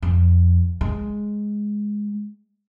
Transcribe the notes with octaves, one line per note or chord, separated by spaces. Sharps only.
F2
G#3